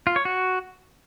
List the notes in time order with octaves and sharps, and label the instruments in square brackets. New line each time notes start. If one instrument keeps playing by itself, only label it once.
[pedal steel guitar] F4
C#5
F#4